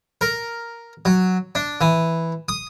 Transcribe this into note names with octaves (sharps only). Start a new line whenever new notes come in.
A#4
F#3
D4
E3
D#6